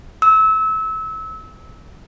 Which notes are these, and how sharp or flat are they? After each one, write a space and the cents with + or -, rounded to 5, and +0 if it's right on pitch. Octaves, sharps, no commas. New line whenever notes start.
E6 -25